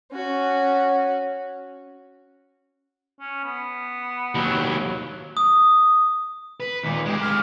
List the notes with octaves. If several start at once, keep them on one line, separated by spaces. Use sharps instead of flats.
C#4 F#4
C#4
B3
D#2 F#3
D#6
B4
D#2 A#2
G#3 G4
F6